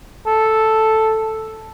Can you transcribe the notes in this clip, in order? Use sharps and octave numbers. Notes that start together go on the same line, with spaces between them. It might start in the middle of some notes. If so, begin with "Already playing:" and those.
A4